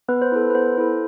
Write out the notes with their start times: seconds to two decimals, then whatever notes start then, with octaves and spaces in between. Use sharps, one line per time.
0.08 B3 B4
0.22 C5
0.32 E4 A4 B4
0.50 B4
0.55 B3 C5
0.78 E4 A4